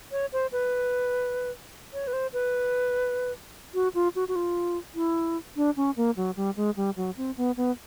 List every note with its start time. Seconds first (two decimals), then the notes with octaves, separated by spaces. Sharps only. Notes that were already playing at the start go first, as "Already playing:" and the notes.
0.12 C#5
0.33 C5
0.52 B4
1.94 C#5
2.07 B4
2.13 C5
2.33 B4
3.74 F#4
3.95 F4
4.16 F#4
4.28 F#4
4.36 F4
4.95 E4
5.56 D4
5.77 C#4
5.97 A#3
6.17 F#3
6.37 G3
6.56 G#3
6.76 G3
6.97 F#3
7.17 C4
7.37 B3
7.57 B3